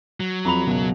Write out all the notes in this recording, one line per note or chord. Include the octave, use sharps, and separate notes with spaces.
F#3
F2 A#5 B5 F7
C#2 F#2 B2